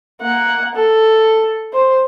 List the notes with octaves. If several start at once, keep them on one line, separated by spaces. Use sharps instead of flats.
A#3 F#5
A4
C5